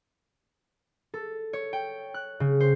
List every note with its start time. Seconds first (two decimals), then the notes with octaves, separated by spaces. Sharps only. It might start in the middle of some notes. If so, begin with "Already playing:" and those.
1.14 A4
1.53 C#5
1.73 G5
2.14 F#6
2.40 C#3
2.60 C5